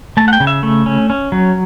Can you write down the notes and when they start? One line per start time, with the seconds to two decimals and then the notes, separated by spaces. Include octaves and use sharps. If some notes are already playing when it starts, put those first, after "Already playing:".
0.17 A3 A5
0.28 F#5
0.33 G5
0.40 C#3
0.47 E5
0.63 A3
0.86 C#4
1.10 C#4
1.32 F#3